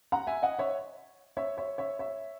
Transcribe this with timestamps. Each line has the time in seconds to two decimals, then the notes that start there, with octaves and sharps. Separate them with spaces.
0.12 F#5 A#5
0.27 E5 G#5
0.42 D#5 F#5
0.59 C#5 E5
1.37 C#5 E5
1.57 C#5 E5
1.78 C#5 E5
1.99 C#5 E5